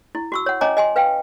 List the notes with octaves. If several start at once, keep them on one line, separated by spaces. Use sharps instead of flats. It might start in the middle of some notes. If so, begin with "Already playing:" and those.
E4
F#4 C#6 E6
C#5 F#5
C#4 C#5 D#5 G#5 A#5 D6
D#5 G#5 C6
B4 F5 G5